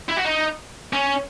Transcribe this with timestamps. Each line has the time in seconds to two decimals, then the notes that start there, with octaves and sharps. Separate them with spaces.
0.08 E4
0.16 F#4
0.25 D#4
0.93 C#4